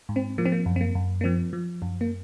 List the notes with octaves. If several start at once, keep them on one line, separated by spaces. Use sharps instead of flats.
G#2
C4
F3 A#3
C4
A#3
F#2
C4
A#3
F#2
A#3
F3 C4
F3
F#2
A#3